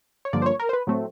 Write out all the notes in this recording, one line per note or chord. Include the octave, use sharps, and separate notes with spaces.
C#5
G2 D3 F3 A#3 D5
C5
C#5
A#4
C5
B4
A2 F#3 A3 C4